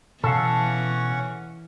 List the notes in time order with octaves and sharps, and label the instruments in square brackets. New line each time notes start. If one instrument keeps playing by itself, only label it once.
[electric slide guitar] B2 F5 [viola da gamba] E3 [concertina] C#4 F#5 C#6 [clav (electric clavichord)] A4